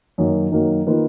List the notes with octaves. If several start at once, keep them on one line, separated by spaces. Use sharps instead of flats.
F#2 D#3 F#3 A#3
F#2 D#3 F#3 A#3
D#3 A#3 F4 B4